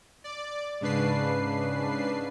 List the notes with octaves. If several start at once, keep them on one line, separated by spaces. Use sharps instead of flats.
D5
G#2 C#3 D4 B4 C7